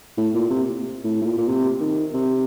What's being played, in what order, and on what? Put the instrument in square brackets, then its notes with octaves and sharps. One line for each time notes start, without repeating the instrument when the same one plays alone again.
[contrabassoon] A2
A#2
C3
A2
A2
A#2
A#2
C3
D#3
C3